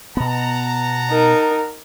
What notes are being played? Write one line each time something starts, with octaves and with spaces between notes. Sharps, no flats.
B2 B3 F#5 A5 A#5
D#4 A#4